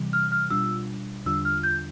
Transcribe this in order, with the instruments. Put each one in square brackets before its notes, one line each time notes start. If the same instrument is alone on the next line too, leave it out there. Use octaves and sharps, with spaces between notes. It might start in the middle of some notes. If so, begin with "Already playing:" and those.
Already playing: [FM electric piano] C3 E3 G3
[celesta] F6
F6
[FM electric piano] B2 G3 D4 F4 [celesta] E6
[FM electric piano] E2 D3 G3 D4 F4 [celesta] E6
[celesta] F6
G6